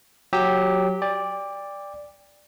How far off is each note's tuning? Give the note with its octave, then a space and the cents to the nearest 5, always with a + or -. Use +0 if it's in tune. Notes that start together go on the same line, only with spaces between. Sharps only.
F#3 -5 G4 +0 E6 -35
D5 +0 G5 +30